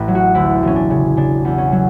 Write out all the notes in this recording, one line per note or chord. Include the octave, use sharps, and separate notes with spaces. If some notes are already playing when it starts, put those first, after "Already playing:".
Already playing: A1 B4 C#5
F#3
F#4
D2 E4
E1 C#4
D4
C#3
C#3 D4
E2
C#4
F#3